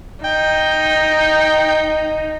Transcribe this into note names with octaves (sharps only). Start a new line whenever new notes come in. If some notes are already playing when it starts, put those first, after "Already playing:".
D#4 G5